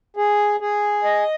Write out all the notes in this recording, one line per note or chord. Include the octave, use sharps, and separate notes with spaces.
G#4
G#4
D#5